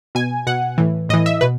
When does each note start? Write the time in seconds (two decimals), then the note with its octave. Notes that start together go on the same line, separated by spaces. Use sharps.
0.15 B2 G#5
0.47 B2 F#5
0.78 A2 E3
1.09 A2 D#5
1.13 E3
1.26 E5
1.41 B2 B4